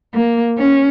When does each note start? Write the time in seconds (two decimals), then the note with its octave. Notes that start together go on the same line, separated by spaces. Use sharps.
0.14 A#3
0.58 C#4